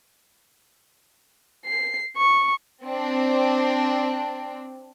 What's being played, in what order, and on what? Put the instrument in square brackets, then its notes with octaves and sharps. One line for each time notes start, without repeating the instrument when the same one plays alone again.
[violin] C7
C#6
[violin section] C4 D4